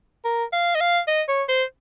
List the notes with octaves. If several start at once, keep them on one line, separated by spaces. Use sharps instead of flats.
A#4
F5
D#5
F5
D#5
C#5
C5